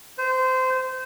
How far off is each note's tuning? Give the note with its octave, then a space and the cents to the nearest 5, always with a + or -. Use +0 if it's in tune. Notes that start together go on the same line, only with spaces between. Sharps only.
C5 -20